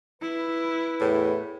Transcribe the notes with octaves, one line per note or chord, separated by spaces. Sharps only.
E4 B4
E2 A2